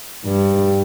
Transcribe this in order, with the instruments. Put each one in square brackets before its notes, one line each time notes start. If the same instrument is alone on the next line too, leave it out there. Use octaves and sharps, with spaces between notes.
[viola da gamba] G2